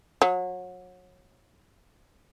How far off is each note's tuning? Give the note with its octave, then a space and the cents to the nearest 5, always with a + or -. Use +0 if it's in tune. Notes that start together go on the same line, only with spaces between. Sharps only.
F#3 -30